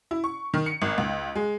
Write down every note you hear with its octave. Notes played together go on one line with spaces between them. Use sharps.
E4
C#6
D#3
C#7
G#1
C#2
G#3